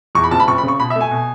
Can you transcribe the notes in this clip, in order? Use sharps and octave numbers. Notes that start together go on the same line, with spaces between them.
E2 C#6
B5
F#1 A5
B5
F#1 C#6
B5
C#3
C#6
B2 B5
E5
A3
G#5
B2